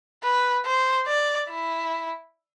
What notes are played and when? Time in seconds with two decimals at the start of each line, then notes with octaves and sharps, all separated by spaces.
0.23 B4
0.65 C5
1.07 D5
1.50 E4